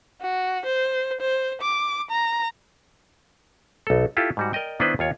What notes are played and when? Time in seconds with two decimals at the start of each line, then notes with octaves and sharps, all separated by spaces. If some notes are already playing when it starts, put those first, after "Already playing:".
0.22 F#4
0.66 C5
1.21 C5
1.62 D6
2.11 A#5
3.87 B1 A4
4.17 E4 F4 G4 A4
4.37 G#2 G3 F#4
4.53 A#4 D5 D#5 G5
4.80 D#3 B3 D4 E4 B4 C5
4.99 D#2 F4 C#5